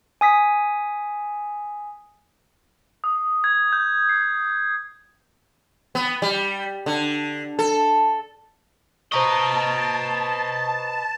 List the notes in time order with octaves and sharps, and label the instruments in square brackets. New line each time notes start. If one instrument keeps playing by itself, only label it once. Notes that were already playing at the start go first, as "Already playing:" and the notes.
[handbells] G#5 D#6 B6
[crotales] D#6
G#6
G6
C7
[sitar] B3
G3
D3
A4
[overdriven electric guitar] B4 D#5 [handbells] C5 A#5 C#6 [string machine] A5